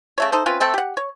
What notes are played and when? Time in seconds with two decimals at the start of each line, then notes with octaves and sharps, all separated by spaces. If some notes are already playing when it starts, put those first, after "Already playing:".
0.18 C#3 A3 C#5
0.32 D#4 A4 C5
0.46 C4 C#4 F4 B4
0.60 A3 C4 A4 G5
0.74 G4 F#5
0.97 C#5